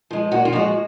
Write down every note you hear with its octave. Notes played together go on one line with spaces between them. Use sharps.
F3 G#3
A#2 F#4
F4
F3 G#3 F#4